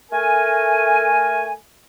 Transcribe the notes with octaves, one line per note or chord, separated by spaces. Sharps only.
A3 A#4 G#5